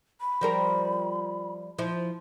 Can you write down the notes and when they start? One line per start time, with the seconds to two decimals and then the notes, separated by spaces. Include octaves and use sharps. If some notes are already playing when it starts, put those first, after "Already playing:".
0.21 B5
0.41 F3 G3 A#4
1.78 F3 E4